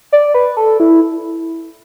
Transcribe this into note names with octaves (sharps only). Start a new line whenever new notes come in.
D5
B4
A4
E4